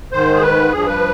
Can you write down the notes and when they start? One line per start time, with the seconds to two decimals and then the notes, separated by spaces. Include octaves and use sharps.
0.12 G#2 D#3 C5
0.35 G#4
0.42 B4
0.71 G2 F3 G#4
0.87 B4